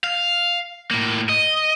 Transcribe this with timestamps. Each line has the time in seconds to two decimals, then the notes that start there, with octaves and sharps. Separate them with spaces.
0.04 F5
0.91 A2 A#3
1.29 D#5